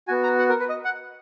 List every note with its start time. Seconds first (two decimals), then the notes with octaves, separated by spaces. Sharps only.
0.08 B3 F#4 G#5
0.24 A#5
0.39 F#5
0.49 A#4
0.60 B4
0.69 D#5
0.85 F#5